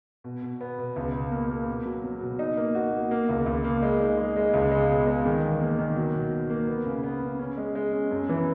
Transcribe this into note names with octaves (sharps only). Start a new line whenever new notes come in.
B2
B2
B3
B2
C#2
B2
A#3
A#3
B2
F#3
F#3
B2
D#4
A#3
F#4
A#3
A#3
C#2
C#2
A#3
G#3
D#4
G#3
G#3
C#2
G#3
B2
G#3
D#3
E2
A#3
D#3
F#3
B2
F#3
A#3
B3
C#3
B3
C#3
C#4
G#3
G#3
C#4
F#2
E3